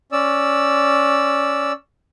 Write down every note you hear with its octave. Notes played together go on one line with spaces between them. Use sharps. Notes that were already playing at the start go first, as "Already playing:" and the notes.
C#4 D5 E6